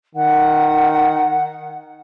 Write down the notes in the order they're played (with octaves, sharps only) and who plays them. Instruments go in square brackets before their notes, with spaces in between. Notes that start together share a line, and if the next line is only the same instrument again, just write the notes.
[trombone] D#3 [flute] F#5